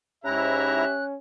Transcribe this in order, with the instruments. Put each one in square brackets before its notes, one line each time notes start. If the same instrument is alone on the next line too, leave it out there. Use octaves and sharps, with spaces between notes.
[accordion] G#2 E4 A#5 [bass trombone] C#4 [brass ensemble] G4 E5 [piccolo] F#6